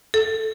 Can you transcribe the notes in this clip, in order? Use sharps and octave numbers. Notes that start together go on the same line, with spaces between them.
A4